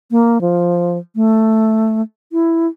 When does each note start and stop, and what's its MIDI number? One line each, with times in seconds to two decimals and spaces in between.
0.11 0.41 58
0.41 0.98 53
1.16 2.02 57
2.32 2.67 64